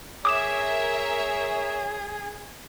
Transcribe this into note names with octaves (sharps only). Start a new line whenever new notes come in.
G#4 A#4 C#5 E5 D6 D#6 E7